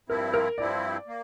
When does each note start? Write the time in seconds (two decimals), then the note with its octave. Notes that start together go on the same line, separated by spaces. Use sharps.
0.09 G2 F3 C4 E4 A#4
0.34 A#4
0.58 G2 F3 C4 E4 D5
1.07 A#3